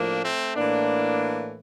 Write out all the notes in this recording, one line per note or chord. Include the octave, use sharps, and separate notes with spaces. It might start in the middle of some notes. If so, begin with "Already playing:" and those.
Already playing: A2 F3 A#3 D4
A3 C4
A2 E3 A#3 D4